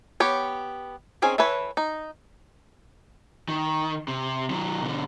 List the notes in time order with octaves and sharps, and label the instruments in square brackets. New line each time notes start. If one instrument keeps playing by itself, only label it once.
[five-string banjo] B3 G4 C#5
D#3 C4 C#4 G#4
E3 E4 A4 B4 C#5
D#4
[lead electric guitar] D#3
C3
D#3 F#3
B2 D3